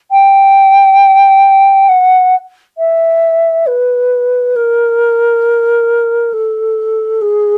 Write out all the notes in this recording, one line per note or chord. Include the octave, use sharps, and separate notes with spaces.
G5
F#5
E5
B4
A#4
A4
G#4